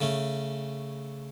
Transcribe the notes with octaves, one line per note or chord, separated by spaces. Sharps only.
C#3 A3 C#4